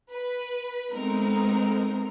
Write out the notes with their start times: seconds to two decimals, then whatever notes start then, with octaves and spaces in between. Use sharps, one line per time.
0.11 B4
0.93 G#3 A3 B3 C4 D#4 A#4